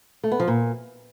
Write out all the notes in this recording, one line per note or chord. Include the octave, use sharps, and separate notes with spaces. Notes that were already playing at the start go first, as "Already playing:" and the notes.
A3
B3
F3
A#2